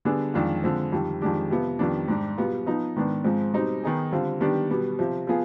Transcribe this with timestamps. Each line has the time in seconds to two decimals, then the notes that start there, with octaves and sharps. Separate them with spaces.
0.05 D3 G3 B3 D4 G#4
0.34 F2 D#3 G#3 D4 F4
0.64 D3 F3 G#3 C4
0.92 F2 D#3 G3
1.21 F2 D#3 G#3 D4 G4
1.51 C3 F3 B3
1.79 F2 D#3 G3 B3 D4
2.08 G#2 G3 D4 G4
2.38 B2 G3 B3 F4
2.67 F3 B3 D#4
2.96 G#2 D#3 B3 D4
3.24 G#2 F3 G#3 C4
3.53 B2 G3 C4 D#4
3.83 D#3 B3 D#4 G#4
4.12 D3 G3 C4 F4
4.40 D#3 G3 B3 D4 G4
4.70 B2 G3 B3
4.99 C3 F3 C4
5.27 F3 B3 F4 G#4